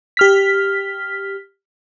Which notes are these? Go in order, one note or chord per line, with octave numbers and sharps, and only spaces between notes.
G4 F6 B6